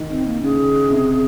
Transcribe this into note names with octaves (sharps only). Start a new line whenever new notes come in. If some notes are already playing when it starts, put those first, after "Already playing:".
Already playing: D#3
C4
A#3
C#3 G#4
C3